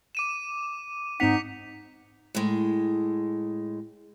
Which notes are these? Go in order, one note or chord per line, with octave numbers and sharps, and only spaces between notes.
D6 D#7 E7
G#2 C4 D#4 F#5 B6 C#7 F7
A2 G#3